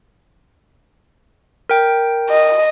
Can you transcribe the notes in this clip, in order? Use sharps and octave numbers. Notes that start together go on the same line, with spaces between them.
A#4 G5
D#5